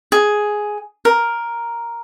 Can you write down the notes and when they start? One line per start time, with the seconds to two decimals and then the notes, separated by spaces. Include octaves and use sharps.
0.12 G#4
1.05 A#4